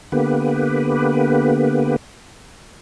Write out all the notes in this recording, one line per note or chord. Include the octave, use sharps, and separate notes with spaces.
D3 A#3 B3 G4 B4